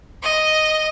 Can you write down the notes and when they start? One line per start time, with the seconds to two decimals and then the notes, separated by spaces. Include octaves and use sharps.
0.23 D#5